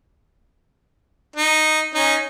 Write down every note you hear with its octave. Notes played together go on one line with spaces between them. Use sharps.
D#4
C#4 D#4